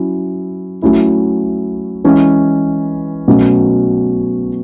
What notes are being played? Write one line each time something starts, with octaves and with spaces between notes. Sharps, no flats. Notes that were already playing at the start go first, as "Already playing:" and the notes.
Already playing: F#3 C#4 E4
F#3 A3 C#4 E4
E3 G#3 C#4 E4
B2 F#3 A3 C#4